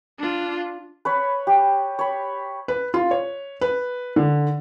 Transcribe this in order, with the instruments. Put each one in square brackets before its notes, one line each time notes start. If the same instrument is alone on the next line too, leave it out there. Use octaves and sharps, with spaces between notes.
[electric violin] D4 F4
[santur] B4 C#5 B5
G4
C#5 B5
[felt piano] B4
F4
C#5
B4
D3